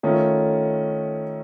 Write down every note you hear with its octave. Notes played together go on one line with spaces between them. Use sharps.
D#3 A3 C#4 F4